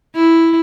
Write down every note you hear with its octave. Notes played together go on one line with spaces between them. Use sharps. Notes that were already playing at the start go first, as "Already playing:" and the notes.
E4